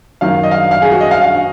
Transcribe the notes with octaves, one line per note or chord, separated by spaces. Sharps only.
F#2 D#3 F#3 F5
D#5
F5
F5
G#4
F#4
D#5
F5
F5